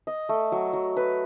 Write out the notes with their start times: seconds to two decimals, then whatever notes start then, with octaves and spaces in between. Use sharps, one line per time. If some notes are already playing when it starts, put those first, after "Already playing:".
0.07 D#5
0.29 A3
0.52 F#3
0.73 F#3
0.97 B4